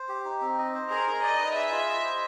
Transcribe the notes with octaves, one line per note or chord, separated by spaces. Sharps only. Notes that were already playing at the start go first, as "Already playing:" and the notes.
Already playing: C5
G4
D#4
C4
D#5
C5
G#4 A#4
D#4
D5 D#5
B4
G#4 E5
F4
D#5
C5